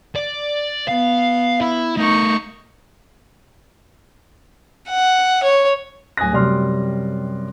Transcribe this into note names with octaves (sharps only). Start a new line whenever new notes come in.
D5
B3 F5
E4
A3 D#4 A#4 C#6
F#5
C#5
D1 G#5 D#6 F#6 A#6
F#2 C3 G3 D5 C6 F6